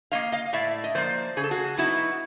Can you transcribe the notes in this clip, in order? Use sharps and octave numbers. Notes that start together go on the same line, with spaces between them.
F3 A#3 D#5 F5
D#5 F5
A2 D5 E5
D#5
F3 A#3 C5 D5
C#3 G#4
A4
F#4 G#4
F#3 B3 D#4 E4 F#4